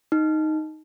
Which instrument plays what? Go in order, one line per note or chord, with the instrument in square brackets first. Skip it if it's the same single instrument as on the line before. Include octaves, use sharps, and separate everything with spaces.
[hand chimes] D#4